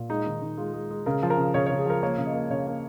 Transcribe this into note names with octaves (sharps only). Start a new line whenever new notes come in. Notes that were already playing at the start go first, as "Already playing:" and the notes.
Already playing: A#2
G#3 D#4
D#3
D#3
G#3 F4
G#3
G#3
C#3 A#4
F3
A#4
C#3
C#3 C#5
C#5
C#3
G#4
F3 A#4
A#3 C#5
C#3
D#5
A#3
C#3 C#5
A#3